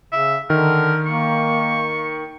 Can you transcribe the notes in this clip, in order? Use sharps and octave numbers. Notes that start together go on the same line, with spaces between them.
C#3 E5
D3 D#3 A#4
A#3 C#6